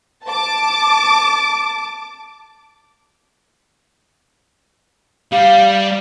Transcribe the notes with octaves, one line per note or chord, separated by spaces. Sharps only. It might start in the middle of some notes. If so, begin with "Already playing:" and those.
A5 D6
G3 F5